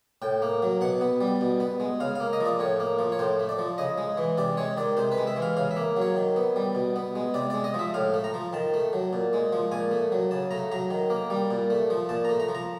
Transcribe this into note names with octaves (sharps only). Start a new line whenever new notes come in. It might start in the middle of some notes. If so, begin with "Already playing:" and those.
A2 G5
A#3
F#3
B2 F#5
B3
G3
B2
B3
G#3
C#3 F5
A#3 F5
D#5
F3
D5
A2 C#5
A#3
F3
C#5
A2 C5
A3
D5
F3
C#3 D#5
G#3
E3
C3 D5
G#3 C#5
D#3 D5
C3 C5
B4
G#3
E5
E3
F5
C#3 F5
E5
A#3
F#3 C#5
D#3
B3
G3
B2
B3
G#3
C3 D5
G#3 D5
D#5
F3 E5
A2 F5
A3
A#5
F3
D#3 A5
A3
F#3
A#2
G#3
F3
A#2 G#5
A3
F#3
C#3 A5
A3 A#5
F#3 A#5
D#3
A#3
G3
A#2
A3
F3
A#2 A5
A3 A#5
A#5
F3
A#5